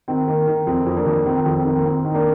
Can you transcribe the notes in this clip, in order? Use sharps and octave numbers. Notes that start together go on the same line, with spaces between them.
D#3 C4
D#3 A#3
D#3
F2 C4
F2
A#3 D4
F2
D#3 C4
C4
F2
C4
D#3
C4
A#3
D#3 C4
D#3
D#4
A#3 D4